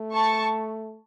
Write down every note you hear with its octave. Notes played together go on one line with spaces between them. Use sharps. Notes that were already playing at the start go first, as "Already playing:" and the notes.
Already playing: A3
A5 C#6